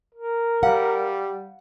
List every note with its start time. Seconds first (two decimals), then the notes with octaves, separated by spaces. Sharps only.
0.15 A#4
0.63 G3 F5 F#5